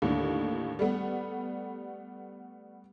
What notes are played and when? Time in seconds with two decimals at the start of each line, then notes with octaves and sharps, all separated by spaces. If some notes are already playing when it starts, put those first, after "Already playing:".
0.02 D#2 A2 D3
0.79 G3 A3 B3